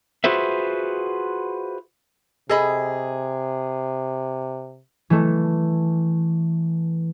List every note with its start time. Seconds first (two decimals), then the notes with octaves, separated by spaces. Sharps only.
0.24 F4 F#4 G#4 B4 C5 E5
2.49 C3 G#4 A4 D#5 B5
5.10 E3 A3